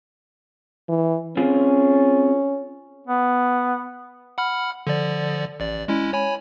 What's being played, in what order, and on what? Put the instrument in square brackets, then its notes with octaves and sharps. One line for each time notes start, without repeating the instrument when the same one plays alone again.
[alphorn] E3
[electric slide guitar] C4 F4 G#4 [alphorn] C#4
[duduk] B3
[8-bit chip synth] F#5 B5 F6
D3 F3 D5
A1 D5
G#3 C#4 E4
C#5 G#5 B5